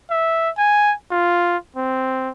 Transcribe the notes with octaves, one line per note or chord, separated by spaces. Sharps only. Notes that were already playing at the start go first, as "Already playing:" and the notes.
E5
G#5
F4
C4